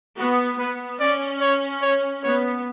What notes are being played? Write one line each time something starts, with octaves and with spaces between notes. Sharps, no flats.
B3 F#4
B3 B4
C#4 D5
C#5
C#5
B3 C#5